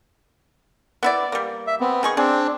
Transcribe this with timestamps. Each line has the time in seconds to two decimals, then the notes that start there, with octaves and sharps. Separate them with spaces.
1.03 B3 E4 D5
1.32 G3 A#3
1.67 E5
1.80 B3 C4
2.03 D#3 G#4 C#6
2.17 C4 D4 G#4